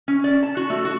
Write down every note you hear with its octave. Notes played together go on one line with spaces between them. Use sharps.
C#4
D5
A5
F#4
A3
F#4